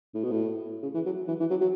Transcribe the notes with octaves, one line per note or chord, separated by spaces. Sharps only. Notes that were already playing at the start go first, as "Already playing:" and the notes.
A2
B2
A2
C#3
E3
F#3
E3
E3
F#3
F#3